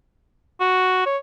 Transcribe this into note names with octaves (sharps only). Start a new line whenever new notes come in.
F#4
C#5